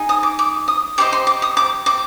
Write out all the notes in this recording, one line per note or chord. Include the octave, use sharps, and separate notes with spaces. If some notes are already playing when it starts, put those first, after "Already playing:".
Already playing: D#4 G#4
D#6
D6
D6
D#6
G4 C5 D#5 D6
C6
D6
D#6
D6
D6